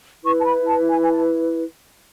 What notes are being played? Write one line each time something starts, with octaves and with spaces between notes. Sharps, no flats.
E4 B4 C#6
A5
B5
A5
G#5
G#5
A5